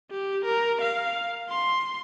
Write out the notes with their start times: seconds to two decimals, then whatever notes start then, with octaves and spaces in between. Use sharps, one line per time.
0.11 G4
0.45 A#4
0.81 F5
1.49 C6